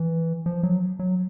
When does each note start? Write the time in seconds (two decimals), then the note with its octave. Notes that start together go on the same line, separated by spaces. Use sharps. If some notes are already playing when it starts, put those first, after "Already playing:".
Already playing: E3
0.46 F3
0.63 F#3
0.99 F#3